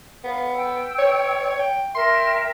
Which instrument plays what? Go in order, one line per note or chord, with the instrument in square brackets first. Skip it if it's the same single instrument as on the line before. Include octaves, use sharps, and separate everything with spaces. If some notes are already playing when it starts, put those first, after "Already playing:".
[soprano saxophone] B3 [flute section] F5
[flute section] G5 E6
[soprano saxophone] C#5
G5
[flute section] A#4 E5 G5 [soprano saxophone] C6